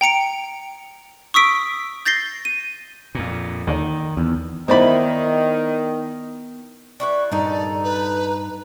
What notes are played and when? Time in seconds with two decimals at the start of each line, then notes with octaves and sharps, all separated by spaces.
0.01 G5 A#5 C#7 D7
1.34 C#6 D#6 E6 B6 D7
2.05 G6 A6 A#6 C7 G7
2.45 D#7
3.15 F2 A#2
3.67 D#2 D3 D#3
4.17 E2
4.68 D#3 B3 E4 C5 D5 B5
7.00 G3 E4 B4 C#6
7.32 G2 D#3 D#4 A4 D5 A#5
7.84 B4